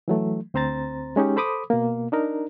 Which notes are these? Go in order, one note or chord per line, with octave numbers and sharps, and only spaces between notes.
E3 F#3 A3
D2 C4 C5 A#5 A6
G#3 C#4 D#4 G4
A4 C5 B5 D6 D#6
B2 A#3
D4 D#4 A#4